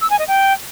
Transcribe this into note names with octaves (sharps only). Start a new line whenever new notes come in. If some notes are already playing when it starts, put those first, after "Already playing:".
E6
G#5
D#5
G5